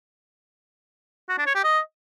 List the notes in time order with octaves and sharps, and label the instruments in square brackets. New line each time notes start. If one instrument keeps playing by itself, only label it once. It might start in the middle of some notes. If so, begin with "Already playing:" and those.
[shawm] F#4
D4
C#5
G4
D#5